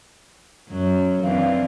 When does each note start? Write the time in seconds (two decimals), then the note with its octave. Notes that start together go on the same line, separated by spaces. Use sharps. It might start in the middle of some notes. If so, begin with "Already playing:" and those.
0.68 F#2 F#3
1.23 E3 C4 D4 F5